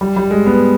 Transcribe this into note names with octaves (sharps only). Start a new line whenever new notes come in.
G3
G3
G#3
B3